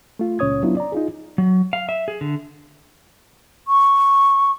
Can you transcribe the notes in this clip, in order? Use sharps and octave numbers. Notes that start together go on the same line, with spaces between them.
A3 F4
C#2 A#2 C#4 C#5 D#6 G#6
F#3 B3 D4 E4 F4
D5 A#5
D#4 F4 G#4
F#3
F5
E5
G#4
D3
C#6